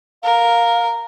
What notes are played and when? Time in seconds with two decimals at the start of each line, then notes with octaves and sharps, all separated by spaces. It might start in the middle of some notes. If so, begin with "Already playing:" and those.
0.23 A#4 F5